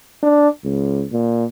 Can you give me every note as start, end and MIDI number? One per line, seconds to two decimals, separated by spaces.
0.23 0.48 62
0.64 1.05 37
1.12 1.45 46